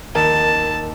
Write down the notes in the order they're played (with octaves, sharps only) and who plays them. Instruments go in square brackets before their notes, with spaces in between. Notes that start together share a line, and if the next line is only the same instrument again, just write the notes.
[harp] D#2 [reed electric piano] A#4 [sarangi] A5